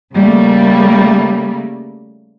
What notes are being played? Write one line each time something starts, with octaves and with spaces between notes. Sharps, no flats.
C#3 G3 A3 A#3